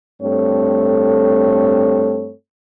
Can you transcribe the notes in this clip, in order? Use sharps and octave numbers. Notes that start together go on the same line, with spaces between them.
G2 A3 C4 A4 C#5